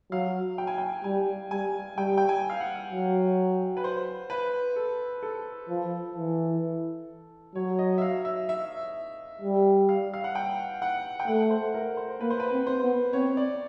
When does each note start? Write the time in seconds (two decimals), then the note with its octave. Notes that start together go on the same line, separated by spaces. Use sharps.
0.11 F#3 F5
0.58 G5
0.67 G#5
0.78 G5
1.04 G3 G#5
1.51 G3 G#5
1.97 G3 G5
2.18 G5
2.29 G#5
2.50 F5
2.60 F#5
2.91 F#3
3.77 B4
3.84 C5
4.30 B4
4.76 A4
5.23 A4
5.69 F3
6.16 E3
7.55 F#3 C#5
7.79 D#5
7.98 E5
8.02 F5
8.25 E5
8.49 E5
9.42 G3
9.89 F5
10.14 F5
10.24 F#5
10.35 G5
10.82 F#5
11.20 G5
11.28 A3 F#5
11.50 C5
11.74 A#4
11.97 C5
12.21 A#3 B4
12.30 C5
12.40 B4
12.52 C4
12.67 C5
12.83 B3
13.13 C4 C#5
13.37 D5